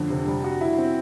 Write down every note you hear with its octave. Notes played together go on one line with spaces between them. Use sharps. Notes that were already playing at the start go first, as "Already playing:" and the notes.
Already playing: F2 D3
C3
G3
F#4
E4
C4